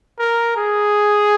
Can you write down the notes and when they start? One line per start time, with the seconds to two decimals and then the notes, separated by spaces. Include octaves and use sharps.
0.19 A#4
0.56 G#4